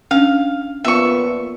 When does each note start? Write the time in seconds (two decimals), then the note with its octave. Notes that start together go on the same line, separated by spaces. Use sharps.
0.11 C#4 D4 F5
0.85 A#2 F3 B3 E5 C#6